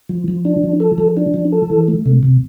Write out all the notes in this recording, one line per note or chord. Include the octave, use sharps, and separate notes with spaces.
F3
F3
D4
F3
A4
F3
D4
F3
A4
E3
A3
C3
C3